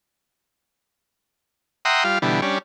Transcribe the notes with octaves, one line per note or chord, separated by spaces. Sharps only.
E5 F#5 G5 A#5 C6 D#6
G3 F4 F5
B2 D3 E3 G3
G3 C#4 D4